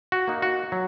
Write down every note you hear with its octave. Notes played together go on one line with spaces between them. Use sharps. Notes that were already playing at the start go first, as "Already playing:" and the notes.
F#4
A#3 D#4
F#4
F#3